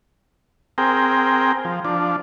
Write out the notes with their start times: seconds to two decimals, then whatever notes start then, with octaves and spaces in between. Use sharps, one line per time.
0.78 C4 G#4 A#4 G5
1.65 F3
1.85 F3 D4